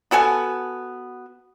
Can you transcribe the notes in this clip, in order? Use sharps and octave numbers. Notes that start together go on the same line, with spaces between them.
B3 F#4 A4 G#5